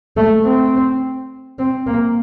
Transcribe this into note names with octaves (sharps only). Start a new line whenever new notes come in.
A3
C4
C4
A#3